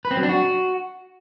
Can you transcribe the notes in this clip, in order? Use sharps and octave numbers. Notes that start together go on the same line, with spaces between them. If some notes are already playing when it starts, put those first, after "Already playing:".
B4
C4
F#3
D4
F#4